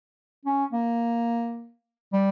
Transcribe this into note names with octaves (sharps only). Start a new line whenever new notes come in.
C#4
A#3
G3